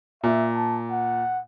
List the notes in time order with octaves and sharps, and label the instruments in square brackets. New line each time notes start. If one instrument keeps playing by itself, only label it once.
[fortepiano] A#2 [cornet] E5
[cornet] A5
F#5